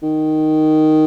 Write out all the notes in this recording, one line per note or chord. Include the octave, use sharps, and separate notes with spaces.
D#3